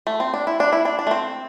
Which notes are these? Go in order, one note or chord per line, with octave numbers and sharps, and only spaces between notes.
A3
C4
D4
E4
D4
E4
D4
D4
A3
C4